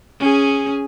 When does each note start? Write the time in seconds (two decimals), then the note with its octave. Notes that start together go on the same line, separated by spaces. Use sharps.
0.20 C#4 G#4